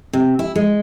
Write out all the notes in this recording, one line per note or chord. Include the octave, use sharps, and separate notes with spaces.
C3
E4
G#3